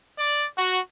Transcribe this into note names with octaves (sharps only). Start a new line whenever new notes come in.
D5
F#4